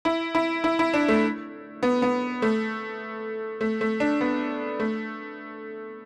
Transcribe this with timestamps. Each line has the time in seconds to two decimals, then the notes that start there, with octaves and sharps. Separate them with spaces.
0.05 E4
0.35 E4
0.64 E4
0.79 E4
0.94 D4
1.08 A3
1.83 B3
2.02 B3
2.42 A3
3.61 A3
3.81 A3
4.00 D4
4.21 B3
4.80 A3